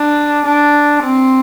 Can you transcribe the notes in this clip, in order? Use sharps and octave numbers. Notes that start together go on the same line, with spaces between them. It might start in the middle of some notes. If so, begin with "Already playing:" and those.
Already playing: D4
D4
C4